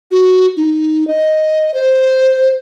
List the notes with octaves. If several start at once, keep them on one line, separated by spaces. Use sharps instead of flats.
F#4
D#4
D#5
C5